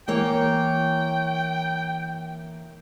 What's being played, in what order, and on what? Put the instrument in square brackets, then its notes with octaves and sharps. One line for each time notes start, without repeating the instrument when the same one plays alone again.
[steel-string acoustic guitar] E3 A#3 C#5 [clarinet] G5